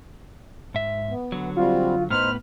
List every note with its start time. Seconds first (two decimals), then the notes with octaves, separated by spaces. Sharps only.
0.74 G#2 E5
1.09 B3
1.32 D3 F#3
1.56 G3 C4 F4 F#4
2.10 A2 B3 D#4 B4 C5 F6